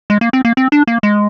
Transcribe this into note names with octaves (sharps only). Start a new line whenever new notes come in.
G#3
A#3
C4
A#3
C4
D4
A#3
G#3